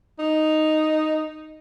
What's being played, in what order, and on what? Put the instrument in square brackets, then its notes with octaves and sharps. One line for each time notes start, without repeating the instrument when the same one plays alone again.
[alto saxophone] D#4